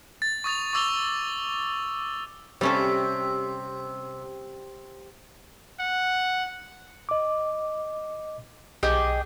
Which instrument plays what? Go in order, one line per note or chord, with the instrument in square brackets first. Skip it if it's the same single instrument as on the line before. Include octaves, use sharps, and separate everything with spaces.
[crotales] A6
C#6 D#6 A6 F7
C#6 D6 E6 A6 F7 G7
[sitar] C3 [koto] G3 C#4 A4
[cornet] F#5
[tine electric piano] D#5 D6
[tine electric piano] B1 [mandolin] G4 G#4 D#5